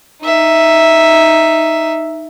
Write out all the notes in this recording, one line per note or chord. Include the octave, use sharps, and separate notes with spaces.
D#4 E5